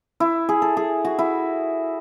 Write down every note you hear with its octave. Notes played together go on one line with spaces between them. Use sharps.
E4
G#4
A4
G#4
F#4
E4